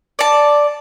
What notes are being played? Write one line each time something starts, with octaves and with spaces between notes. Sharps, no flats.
D5 A5